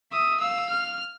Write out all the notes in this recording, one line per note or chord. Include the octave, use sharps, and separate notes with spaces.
E5 D#6
F5 E6
F6